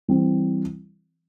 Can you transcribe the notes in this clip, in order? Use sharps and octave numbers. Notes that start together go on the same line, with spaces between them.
E3 G3 C4